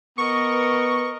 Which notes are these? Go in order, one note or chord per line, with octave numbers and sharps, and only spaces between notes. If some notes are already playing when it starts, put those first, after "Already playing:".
B3 A#4 D#5 C#6
B4